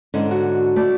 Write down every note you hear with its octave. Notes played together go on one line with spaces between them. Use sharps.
G#2 D3 C#4
F#4
A3 D5